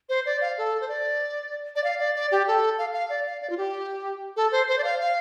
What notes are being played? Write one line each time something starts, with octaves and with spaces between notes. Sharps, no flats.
C5
D5
F5
A4
C5
D5
D5
F5
D5
D5
G4
A4
F5
F5
D5
F5
D5
F4
G4
A4
C5
C5
D5
F5
F5